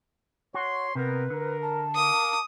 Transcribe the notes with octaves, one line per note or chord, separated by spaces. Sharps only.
F#4 C#5 C6
C3 B3 A#4 B4
D3 A#4
A5
A#4 F5 D6 D#6